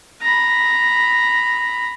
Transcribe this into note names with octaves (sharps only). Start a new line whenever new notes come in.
A#5 B5